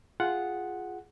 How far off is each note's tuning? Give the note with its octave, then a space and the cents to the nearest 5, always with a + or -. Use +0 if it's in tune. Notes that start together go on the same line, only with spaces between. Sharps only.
F4 +0 G#4 +0 F#5 +0